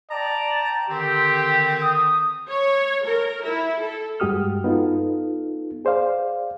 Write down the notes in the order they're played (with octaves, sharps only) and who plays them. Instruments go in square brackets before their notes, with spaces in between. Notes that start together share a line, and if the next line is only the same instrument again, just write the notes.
[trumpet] D5 [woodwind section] G5 A5 A#5
[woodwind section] D3 D#3 C4 [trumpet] G4
[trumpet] D#6
[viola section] C#5
A#4
E4
A4
[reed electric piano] G2 G#3 F#4 G4 D#6 F6
B3 D#4 F4 A4
G#4 C5 D5 F5